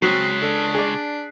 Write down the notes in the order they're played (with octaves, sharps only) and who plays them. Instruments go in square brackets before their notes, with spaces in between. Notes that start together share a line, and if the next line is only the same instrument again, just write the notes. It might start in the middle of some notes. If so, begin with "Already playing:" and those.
[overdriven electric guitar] C#3 G#3 [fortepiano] F#3 [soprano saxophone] C4 [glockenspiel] F#6 B6 C7
[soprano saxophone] D4 [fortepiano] A4
[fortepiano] G#4 D5